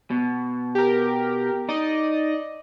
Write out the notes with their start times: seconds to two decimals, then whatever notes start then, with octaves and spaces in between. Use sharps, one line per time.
0.10 B2
0.75 G4 A#4
1.69 D#4 D5 D#5